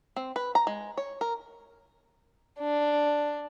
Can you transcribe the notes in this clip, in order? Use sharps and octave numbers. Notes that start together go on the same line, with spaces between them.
C4
B4
A#5
G#3
C#5
A#4
D4